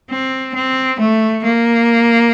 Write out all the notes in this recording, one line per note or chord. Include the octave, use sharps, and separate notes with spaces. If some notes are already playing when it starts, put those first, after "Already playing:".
C4
C4
A3
A#3